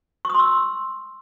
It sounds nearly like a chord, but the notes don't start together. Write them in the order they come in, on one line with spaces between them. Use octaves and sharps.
C#6 D#6 C6 E6